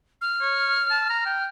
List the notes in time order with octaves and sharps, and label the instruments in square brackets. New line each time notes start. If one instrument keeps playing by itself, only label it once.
[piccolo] F6
[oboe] C#5
A5
A#5
G5